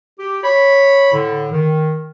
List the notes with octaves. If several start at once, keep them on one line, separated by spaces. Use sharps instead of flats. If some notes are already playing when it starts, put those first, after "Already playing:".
G4
C#5 B5
A2 D3
D#3